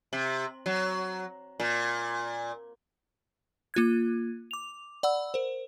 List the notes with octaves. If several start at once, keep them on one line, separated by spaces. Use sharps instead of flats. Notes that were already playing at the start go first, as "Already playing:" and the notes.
C3
F#3
A#2
A#3 F4 F#6 G#6
D6 F7
D5 F#5 B5 E6
A#4 C5